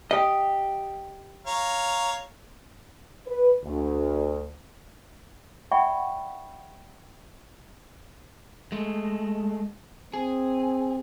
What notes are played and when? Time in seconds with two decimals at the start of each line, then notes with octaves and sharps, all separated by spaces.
0.11 G4 D#5
1.46 C#5 F5 A#5
3.27 B4
3.64 D2
5.71 D5 E5 F#5 G5 B5 C#6
8.72 G#3 A3
10.14 C4 G#4